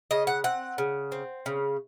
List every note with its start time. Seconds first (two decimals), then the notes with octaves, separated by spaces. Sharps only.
0.11 C#3 D#5
0.27 F#5
0.44 C4 F#5
0.78 C#3
1.12 C4
1.46 C#3